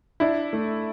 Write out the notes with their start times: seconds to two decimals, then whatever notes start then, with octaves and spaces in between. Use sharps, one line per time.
0.20 D4 E4
0.53 A3